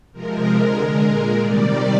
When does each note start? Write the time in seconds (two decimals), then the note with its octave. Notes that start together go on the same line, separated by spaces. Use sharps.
0.12 C3 F3 G#3 A#4
0.55 D3 G#3
0.98 A#2 G#3
1.40 C3 D#3 G3 D5